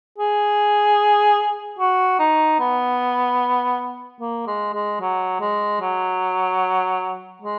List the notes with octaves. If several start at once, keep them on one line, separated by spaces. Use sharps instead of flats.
G#4
F#4
D#4
B3
A#3
G#3
G#3
F#3
G#3
F#3
G#3